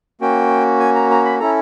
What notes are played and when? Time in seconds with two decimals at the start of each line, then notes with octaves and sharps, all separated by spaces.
0.21 A#3 C#4 F#4 G5
0.80 G#5
0.95 A#5
1.11 A#5
1.25 B5
1.40 C#4 E4 A4 A#5